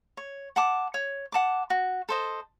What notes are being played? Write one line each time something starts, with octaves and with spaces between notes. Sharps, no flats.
C#5
F#5 A5 D6
C#5
F#5 A5 D6
F#4
A4 C5 D#5